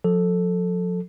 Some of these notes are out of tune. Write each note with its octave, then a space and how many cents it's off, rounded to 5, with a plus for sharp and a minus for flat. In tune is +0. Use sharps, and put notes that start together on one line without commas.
F3 +40 A4 +0